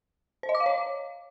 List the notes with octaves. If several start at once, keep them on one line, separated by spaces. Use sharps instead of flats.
C5
D#5
D6
F5
C#5